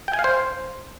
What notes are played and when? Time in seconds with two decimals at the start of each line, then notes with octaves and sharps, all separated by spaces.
0.08 G5
0.13 G#5
0.19 F5
0.24 C5